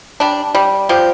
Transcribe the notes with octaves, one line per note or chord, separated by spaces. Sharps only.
G3 D4
G3
F3 G4